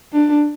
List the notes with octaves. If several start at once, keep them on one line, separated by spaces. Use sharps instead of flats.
D4